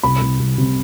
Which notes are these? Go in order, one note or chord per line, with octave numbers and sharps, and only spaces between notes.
C2 B5
C2
C2
C3